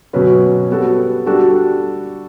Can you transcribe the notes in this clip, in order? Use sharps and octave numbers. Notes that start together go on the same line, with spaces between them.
B2 F#3 C#4 F#4 B4
G3 B3 F#4 A4
G3 D4 F#4 A4